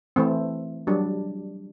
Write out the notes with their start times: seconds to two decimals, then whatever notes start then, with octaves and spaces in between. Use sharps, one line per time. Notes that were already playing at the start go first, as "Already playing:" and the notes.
0.16 E3 A3 C4
0.87 F#3 G3 D4